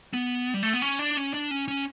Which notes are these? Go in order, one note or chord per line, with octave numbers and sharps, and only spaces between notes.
B3
G3
A3
B3
C#4
D4
C#4
D4
C#4
C#4